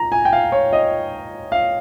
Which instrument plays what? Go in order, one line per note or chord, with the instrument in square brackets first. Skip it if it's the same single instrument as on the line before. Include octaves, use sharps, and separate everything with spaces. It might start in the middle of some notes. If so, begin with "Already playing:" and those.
Already playing: [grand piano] A#5
G#5
G5
F5
C#5
D#5
F5